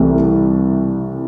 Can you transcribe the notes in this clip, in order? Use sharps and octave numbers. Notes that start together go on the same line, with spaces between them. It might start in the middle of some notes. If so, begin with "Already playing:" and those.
Already playing: C2 C3 E3 A3